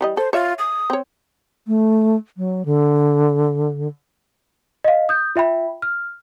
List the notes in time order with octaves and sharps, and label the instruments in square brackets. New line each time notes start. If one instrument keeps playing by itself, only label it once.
[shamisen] E3 G3 D#5
[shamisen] A4 [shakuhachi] C5
[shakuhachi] F4 [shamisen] C#5 E5
[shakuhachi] D#6
[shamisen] C4 C#5
[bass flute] A3
F#3
D3
[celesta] D#5 F5
D#6 G6
F4 E5 G5 B5
F6